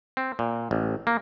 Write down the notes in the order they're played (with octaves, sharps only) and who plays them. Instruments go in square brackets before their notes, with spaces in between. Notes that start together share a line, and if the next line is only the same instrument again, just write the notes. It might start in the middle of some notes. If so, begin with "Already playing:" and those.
[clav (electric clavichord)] C4
A#2
A1
A#3